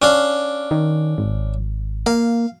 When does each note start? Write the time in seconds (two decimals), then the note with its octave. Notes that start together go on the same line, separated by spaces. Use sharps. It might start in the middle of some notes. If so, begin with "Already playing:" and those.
0.02 C#4 D4 F5
0.71 D#3
1.18 G#1
2.06 A#3 F5